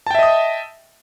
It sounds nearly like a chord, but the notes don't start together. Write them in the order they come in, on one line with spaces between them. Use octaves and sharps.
A5 G5 E5 D#5 D#6